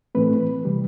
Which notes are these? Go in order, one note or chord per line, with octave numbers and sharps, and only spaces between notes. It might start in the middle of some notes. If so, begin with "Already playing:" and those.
A2 E3 A3 C4 B4
C3 E3 G3